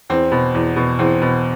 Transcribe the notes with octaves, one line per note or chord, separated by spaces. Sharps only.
E2 C4
B2
E2
B2
E2 C4
B2